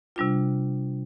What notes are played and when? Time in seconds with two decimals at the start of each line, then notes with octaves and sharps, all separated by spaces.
0.16 C3 G3 D4 F4